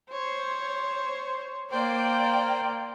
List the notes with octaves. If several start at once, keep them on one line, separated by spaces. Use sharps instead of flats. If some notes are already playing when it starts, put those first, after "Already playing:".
C5 C#5
A#3 C5 D5 G5